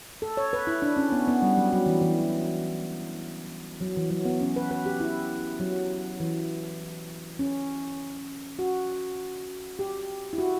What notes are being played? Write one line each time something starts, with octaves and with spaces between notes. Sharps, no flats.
A4
C#5
B4
E4
D4
C#4
B3
B3
G3
F#3
F#3
E3
E3
F#3
E3
F#3
B3
C#4
B4
B4
G4
E4
F#3
E3
C#4
F#4
G4
E4
F#4